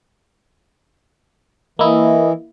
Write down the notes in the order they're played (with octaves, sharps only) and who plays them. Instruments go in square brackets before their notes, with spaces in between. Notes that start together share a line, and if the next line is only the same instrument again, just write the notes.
[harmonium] E3 [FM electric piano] A#3 E4 [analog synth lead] D#5